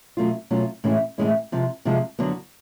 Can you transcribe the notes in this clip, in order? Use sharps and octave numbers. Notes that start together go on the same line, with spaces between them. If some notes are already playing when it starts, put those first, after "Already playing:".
B2 F#3 A3 C#4 F4
B2 F#3 A3 C#4 F4
A2 E3 G#3 C#4 E4
A2 E3 G#3 C#4 E4
C3 F3 G#3
C3 F3 G#3
F2 D3 F#3 B3